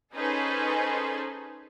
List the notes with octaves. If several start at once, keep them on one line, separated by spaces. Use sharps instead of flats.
C#4 D#4 G#4 A4 B4 C5